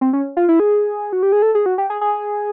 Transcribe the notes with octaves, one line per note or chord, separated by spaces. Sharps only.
C4
C#4
F4
E4
G#4
F#4
G4
G#4
A4
G#4
F#4
G4
G#4
G#4